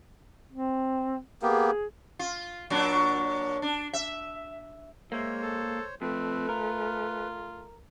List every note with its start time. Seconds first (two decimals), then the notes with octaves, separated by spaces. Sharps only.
0.52 C4
1.42 A#3 B3 G4 G#4
2.19 F4
2.70 A#2 F#3 D4
3.62 D4
3.93 E5
5.12 G#3 A#3 C5 C#5 E5
5.43 A4
6.02 F2 A3 C4 B4
6.49 F4 A#4